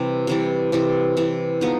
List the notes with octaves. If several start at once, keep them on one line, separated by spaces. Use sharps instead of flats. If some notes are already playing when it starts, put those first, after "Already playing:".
Already playing: C3 E3 G3
C3 E3 G3
C3 E3 G3
C3 E3 G3
F3 G#3 B3 D#4